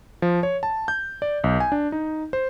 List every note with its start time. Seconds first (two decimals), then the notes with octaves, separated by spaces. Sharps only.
0.22 F3
0.43 C#5
0.63 A5
0.88 G6
1.22 D5
1.44 B1
1.60 G#5
1.72 D4
1.92 D#4
2.33 C5